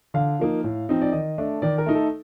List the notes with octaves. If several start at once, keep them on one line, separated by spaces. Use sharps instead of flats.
D3 F5
F3 A#3 D#4
A2
F3 C4 D#4
D5
D#3 D#5
A3 D4
D#3 D5
A#4
A3 D#4
A4